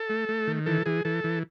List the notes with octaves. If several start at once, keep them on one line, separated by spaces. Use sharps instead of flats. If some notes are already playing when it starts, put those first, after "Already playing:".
Already playing: A4
A3
A3
D#3
E3 A4
E3 G#4
E3 A4
E3